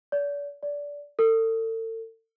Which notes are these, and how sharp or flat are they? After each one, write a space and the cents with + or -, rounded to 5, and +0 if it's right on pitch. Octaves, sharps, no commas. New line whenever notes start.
D5 -40
D5 -20
A4 +35